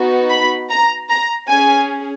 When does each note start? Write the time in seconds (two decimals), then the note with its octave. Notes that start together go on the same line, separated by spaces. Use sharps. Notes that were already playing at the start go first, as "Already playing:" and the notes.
Already playing: B3 D#4 F#4
0.30 B5
0.70 A#5
1.09 A#5
1.49 C#4 G#4 G#5